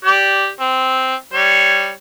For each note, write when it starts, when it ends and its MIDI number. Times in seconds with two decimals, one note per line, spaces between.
0.05 0.49 67
0.05 0.49 74
0.60 1.15 60
1.33 1.91 55
1.33 1.91 73